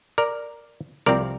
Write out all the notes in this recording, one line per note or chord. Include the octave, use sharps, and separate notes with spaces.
A#4 D5
C2 C3 F3 C4 A#4 D5